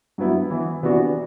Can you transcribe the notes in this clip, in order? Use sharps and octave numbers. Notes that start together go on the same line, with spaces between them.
G2 F#3 B3 E4
E3 B3 E4
C3 E3 B3 D4 F#4